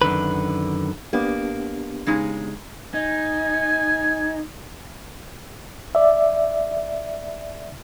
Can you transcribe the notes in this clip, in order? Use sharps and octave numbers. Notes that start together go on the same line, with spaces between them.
F#2 D3 D#3 B4
A#3 B3 D4 G4
C#3 G#3 D#4
D#4 G#5
D5 E5